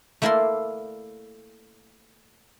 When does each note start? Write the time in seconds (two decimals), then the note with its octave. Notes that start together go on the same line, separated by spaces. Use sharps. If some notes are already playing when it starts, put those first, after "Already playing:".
0.22 A3 A#3 E4 A#4 D5 C6